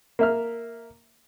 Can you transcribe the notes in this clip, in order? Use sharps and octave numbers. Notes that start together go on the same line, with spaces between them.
A#3 E5 F6